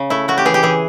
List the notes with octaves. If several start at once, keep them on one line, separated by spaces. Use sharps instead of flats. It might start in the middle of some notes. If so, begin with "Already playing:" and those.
Already playing: C#3
A3 E4
A3 F#4
G4
E3 G#4
G4
E3 G#4